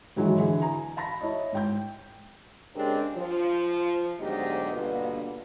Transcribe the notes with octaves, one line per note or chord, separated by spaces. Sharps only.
G#2 D#3 E3 F#3 G#3
D3 E3 G#4
G#5 A#5
F5 A5 B5 A#6
E4 C#5 D#5
G#2 G5 G6
C#3 G#3 C4 D4 G4 A#4
F3
D2 G#2 F#3 B3 G4 D#5
G2 B2 D3 A#3 B3 F4